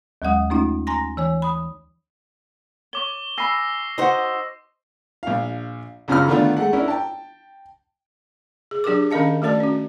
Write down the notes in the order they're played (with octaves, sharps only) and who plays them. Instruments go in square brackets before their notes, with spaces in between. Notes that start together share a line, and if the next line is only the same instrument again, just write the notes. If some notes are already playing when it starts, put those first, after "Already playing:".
[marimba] D#2 F#3 G#3 F#5 D#6
A3 C#4 D#4 F4
G#5 A#5 C6 A#6
E3 C#5 G#5
B5 D#6
[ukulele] C#5 [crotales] C#6 D6 G7
[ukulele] G#5 B5 [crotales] E6 A#6 C7
[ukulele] D#4 F#4 F#5 [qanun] C5 D#5
[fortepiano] A#1 F5
C#2 F#2 C#4 F4 B5 F6
D3 D#3 A3 B3 D4 F4
G#3 A3 F#5
C#4 D4 E4 A#4
G5 A5
[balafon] G#4
F#3 D4 G4 G#4 A#4 D6
D#3 C#4 A#4 D#5 F5 A5
A3 F#4 A4 A#4 D5 A5
C#4 F#4